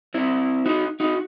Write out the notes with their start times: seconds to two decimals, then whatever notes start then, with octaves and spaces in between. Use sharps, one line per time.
0.14 C4 E4
0.66 D#4 F#4
1.00 D#4 F#4